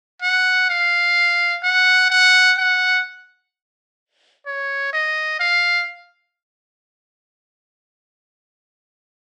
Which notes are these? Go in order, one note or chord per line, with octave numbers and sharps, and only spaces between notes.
F#5
F5
F#5
F#5
F#5
C#5
D#5
F5